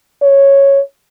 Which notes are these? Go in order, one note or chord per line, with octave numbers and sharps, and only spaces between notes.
C#5